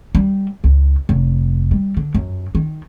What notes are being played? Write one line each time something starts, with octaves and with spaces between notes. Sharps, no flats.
G3
C#2
F1
G3
D3
F#2
D#3